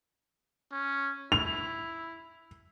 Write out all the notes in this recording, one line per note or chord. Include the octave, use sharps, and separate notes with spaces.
C#4
E4 F7